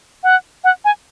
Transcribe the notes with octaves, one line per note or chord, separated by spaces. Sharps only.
F#5
F#5
G#5